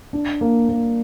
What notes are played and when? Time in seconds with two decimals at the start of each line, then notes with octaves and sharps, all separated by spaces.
0.13 D4
0.41 A#3
0.69 A#3